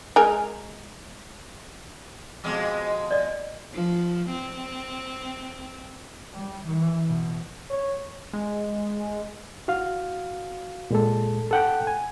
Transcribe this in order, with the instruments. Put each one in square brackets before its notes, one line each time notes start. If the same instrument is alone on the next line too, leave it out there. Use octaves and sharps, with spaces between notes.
[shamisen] G#3 A#4 G#5
[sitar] F2 B2 G#3
[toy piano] D5 D#5
[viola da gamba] F3
C4
[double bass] G3
E3
B2
[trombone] C#5
[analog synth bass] G#3
[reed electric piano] F#4 F5
A#2 G#3 A4
A4 F#5 G5
G#5